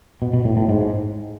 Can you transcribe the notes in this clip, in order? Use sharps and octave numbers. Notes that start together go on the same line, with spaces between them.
B2
B2
A2
A2
G#2